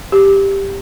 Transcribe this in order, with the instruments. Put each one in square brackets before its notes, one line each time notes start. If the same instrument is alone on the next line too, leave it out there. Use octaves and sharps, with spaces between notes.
[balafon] G4